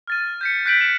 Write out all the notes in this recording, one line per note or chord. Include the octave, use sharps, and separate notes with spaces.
F6 A6 D#7
G6 B6 C#7
F#6 G6 B6 D7 F#7
E7